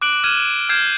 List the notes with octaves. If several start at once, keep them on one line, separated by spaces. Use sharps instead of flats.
D6 F#6 D7 F#7
F6 G#6 D#7 E7
F6 G6 G#6 C7 E7